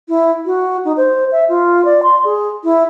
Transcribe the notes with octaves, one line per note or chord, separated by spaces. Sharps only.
E4
F#4
D#4
C5
E5
F4
D5
C6
G#4
E4